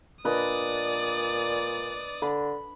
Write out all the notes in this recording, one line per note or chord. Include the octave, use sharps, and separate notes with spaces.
A#2 D4 B4 D5 D#5 D#6
D3 B5